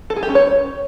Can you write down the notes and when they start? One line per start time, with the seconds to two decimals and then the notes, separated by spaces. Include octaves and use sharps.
0.10 A4
0.16 G#4
0.23 G4
0.29 C#4
0.35 C#5